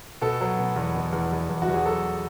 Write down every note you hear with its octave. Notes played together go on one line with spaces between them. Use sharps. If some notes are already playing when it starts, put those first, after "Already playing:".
B2 A4
F#3
B2
E2
B2
E2
E2
E2
F#4
E2
G#4
F#3 A4